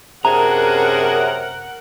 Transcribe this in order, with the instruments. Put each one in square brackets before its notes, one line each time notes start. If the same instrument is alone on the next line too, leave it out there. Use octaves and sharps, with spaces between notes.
[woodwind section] F#2 C3 [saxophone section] D4 F#4 G#4 [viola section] A#4 F#5 [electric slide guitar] A#5